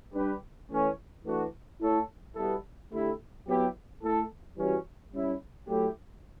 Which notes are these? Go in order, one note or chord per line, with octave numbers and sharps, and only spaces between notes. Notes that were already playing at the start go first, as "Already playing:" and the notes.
G3 D4 G4 B4
E3 A3 C#4
E3 A3 D4 F#4
A3 E4 A4 C#5
B2 G3 B3 E4 A4
D3 A3 E4 G4
F#3 B3 E4 G4
A3 E4 A4
E3 G3 C#4 F#4
G3 C#4 E4
F#3 A3 E4 G4